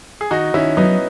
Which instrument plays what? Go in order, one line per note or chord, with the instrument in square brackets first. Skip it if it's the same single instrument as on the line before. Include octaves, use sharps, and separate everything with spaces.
[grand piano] G#4
[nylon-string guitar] D#3 [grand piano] D#4 F#4
[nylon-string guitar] D#3 [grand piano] C#4 E4
[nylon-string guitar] F#3 [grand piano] B3 D#4